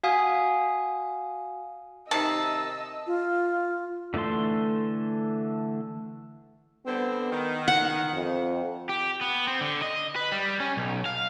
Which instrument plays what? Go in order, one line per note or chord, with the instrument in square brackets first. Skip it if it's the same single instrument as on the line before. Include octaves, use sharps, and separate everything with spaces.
[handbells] F#4 F5 G#5 D#6
[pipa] C3 D#3 [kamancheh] D#5 E6 [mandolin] A5
[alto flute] F4
[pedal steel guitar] D3 E3 A3 A4 C6
[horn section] D3 G3 C4 [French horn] B3
[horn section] D#3
[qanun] F#5
[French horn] F2
[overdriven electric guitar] G4
B3
C4
D3
D#5
B4
G3
C#4
B1
F5